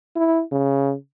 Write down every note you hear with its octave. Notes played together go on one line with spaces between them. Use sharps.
E4
C#3